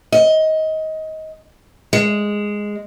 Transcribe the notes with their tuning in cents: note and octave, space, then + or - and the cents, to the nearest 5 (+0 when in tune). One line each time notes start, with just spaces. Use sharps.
D#5 +20
G#3 -5